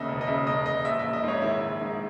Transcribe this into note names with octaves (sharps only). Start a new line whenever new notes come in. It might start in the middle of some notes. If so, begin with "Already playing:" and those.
Already playing: D#2 C#3 D#5 E5
E1
D#5
C#3 E5
E1 D#5
E1 D#5
A#1 E5
E5
A#1
D#5
G#2 C#5
D#3 E4
A#1
G#2